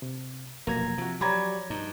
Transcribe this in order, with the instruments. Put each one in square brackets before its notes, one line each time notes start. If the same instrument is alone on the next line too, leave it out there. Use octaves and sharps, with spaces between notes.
[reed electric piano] C3
[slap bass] F1 [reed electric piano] B2 F#3 A#3 [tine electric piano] A#5 G#6 A#6
[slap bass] C3 [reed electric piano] F3 F#4
[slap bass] F#3 [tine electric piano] G4 C#5 D5 [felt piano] A#5 B5 G#6
[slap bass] G2 [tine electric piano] D#4